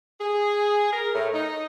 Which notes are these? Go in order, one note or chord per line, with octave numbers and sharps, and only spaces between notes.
G#4
A#4
A2
D#4